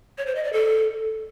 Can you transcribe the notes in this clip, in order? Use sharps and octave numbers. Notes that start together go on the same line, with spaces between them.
C#5
C5
D#5
D5
A4